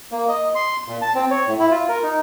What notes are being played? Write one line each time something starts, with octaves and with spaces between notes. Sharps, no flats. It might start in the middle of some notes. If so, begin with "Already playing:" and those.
A#3
D#5
C6
A#2
A5
C4
C#5
A2
E4
F4
A#4
D#4